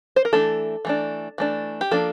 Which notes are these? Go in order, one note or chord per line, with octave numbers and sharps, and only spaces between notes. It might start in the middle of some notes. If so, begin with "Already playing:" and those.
C5
A#4
E3 A3 D4 A4
E3 A3 D4
E3 A3 D4
G4
F3 A#3 D4 A4